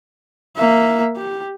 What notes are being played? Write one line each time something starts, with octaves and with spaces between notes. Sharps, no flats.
A#3 E5
G4